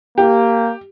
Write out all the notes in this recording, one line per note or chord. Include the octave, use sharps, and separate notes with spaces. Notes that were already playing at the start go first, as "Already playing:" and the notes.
A#3 G4